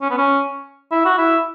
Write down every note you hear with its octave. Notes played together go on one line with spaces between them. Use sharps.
C#4
B3
C#4
E4
F#4
E4